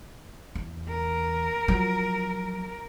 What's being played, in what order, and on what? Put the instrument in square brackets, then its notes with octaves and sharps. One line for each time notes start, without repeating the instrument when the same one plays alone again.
[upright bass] E2
[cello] A#4
[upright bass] F3 F#3